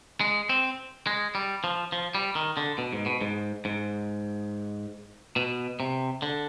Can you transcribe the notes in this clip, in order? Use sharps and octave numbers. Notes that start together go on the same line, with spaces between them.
G#3
C4
G#3
G3
F3
F3
G3
D#3
D3
B2
G#2
B2
G#2
G#2
B2
C3
D3